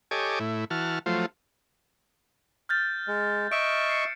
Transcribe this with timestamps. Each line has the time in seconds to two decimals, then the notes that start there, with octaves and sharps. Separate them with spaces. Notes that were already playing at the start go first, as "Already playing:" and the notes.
0.11 G4 A4 C#5 D#5 G#5 D6
0.40 A2 E4
0.70 E3 F#4 A5 F6
1.06 F3 F#3 A3 F4 C5
2.69 F6 G6 A6
3.08 G#3
3.52 D#5 E5 C#6 D7 E7
3.89 C7 C#7